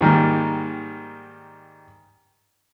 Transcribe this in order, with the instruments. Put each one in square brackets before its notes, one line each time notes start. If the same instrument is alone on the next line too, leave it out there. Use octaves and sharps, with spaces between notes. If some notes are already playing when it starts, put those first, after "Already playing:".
[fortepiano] G#2 D#3 G3 A#3